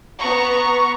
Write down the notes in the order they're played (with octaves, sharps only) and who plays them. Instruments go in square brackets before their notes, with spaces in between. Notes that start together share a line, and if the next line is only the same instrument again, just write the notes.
[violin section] B3 A#5 C#6